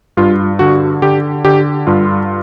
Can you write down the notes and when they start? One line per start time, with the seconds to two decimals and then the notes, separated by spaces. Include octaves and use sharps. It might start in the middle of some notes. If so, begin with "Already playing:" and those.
0.17 G2 F4
0.59 D3 F#4
1.02 D3 G4
1.45 D3 G4
1.87 G2 F4